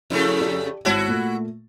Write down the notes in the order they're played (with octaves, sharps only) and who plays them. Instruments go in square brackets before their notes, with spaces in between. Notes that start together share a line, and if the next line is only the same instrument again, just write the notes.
[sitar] F2 C#3 A3 [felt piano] E4 A#4
[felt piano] G4 D5
[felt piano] G#1 C#5 A5 [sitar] E4 F#4
[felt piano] A#2 A3